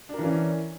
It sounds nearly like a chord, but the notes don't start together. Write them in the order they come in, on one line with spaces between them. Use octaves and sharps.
D4 A#4 E3 C#4